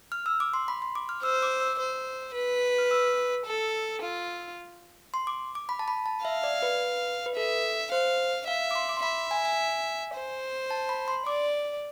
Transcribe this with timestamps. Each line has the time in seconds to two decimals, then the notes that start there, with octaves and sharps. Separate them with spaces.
0.12 F6
0.26 E6
0.40 D6
0.54 C6
0.68 B5
0.82 C6
0.95 D6
1.09 F6
1.23 C5 E6
1.43 D6
1.61 E6
1.79 C5
2.35 B4
2.78 F6
2.91 E6
3.46 A4
4.02 F4
5.14 C6
5.27 D6
5.55 D6
5.69 B5
5.79 A5
5.88 B5
6.06 A5
6.25 E5 F5
6.44 D5
6.62 B4
7.26 B4
7.36 A4 E5
7.92 C5 F5
8.48 E5 F5
8.71 D6
8.75 C6
8.89 D6
8.97 C6
9.03 E5 B5
9.31 G#5
9.45 G#5
10.15 C5
10.71 A5
10.89 B5
11.08 C6
11.26 D5 D6